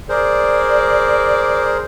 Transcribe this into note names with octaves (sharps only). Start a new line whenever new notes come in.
G#4 A#4 C5 D5